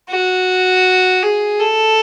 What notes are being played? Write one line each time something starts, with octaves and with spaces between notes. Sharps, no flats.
F#4
G#4
A4